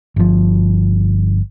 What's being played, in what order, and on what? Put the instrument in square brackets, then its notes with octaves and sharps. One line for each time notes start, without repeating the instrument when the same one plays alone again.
[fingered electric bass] G1 F3